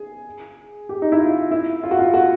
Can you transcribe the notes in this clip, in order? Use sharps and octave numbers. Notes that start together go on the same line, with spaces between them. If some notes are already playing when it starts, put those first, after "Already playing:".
Already playing: G#4
G4
D#4
E4
F4
E4
F4
F#4
F4
F#4